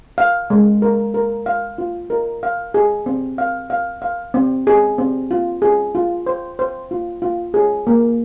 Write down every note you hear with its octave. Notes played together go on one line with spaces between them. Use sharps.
F5
G#3
A#4
A#4
F5
F4
A#4
F5
G#4
C4
F5
F5
F5
C4
G#4
C4
F4
G#4
F4
C5
C5
F4
F4
G#4
A#3